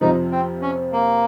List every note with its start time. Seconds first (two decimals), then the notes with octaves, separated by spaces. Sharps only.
0.01 F2 C3 F3 D#4
0.32 C4
0.62 C#4
0.92 A#3